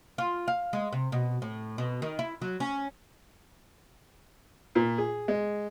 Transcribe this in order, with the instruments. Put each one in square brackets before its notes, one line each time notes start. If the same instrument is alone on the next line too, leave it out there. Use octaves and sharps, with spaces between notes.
[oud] F4
F5
G#3
C3
B2
A2
B2
D#3
E4
F#3
C#4
[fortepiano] A#2
G#4
G#3